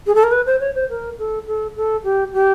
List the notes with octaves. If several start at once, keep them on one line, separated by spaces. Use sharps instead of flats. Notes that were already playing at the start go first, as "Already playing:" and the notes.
G#4
A4
A#4
B4
C5
C#5
C5
A#4
A4
A4
A4
G4
G4